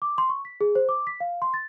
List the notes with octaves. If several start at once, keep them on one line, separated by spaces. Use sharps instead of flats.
D6
C6
C#6
B6
G#4
C5
D6
B6
F5
C6
A6